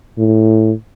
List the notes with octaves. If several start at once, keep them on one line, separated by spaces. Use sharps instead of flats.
A2